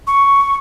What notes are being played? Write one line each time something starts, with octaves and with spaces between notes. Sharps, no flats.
C#6